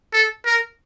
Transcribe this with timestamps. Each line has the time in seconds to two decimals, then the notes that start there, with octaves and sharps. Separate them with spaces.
0.13 A4
0.45 A#4